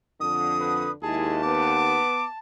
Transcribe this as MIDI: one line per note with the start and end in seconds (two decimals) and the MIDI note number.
0.21 0.90 41
0.21 0.92 50
0.21 0.90 87
0.61 0.91 71
1.02 2.00 39
1.02 1.43 56
1.02 1.43 64
1.02 1.36 68
1.02 2.39 81
1.44 2.23 59
1.44 2.25 86